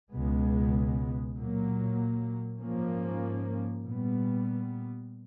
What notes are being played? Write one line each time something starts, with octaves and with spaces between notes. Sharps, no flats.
C#2 B2 G#3 B3
A#2 F#3 A#3
G#2 F3 A#3 C#4
A#2 G3 B3